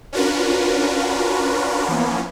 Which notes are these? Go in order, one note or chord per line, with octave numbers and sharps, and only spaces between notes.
C#4 D4 F4 F#4 A#4 B4
E3 F3 A#3 B3 C#4